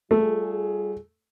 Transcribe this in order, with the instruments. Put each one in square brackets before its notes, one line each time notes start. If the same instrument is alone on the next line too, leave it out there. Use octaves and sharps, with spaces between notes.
[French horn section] G3 F4 G#4 [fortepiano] A3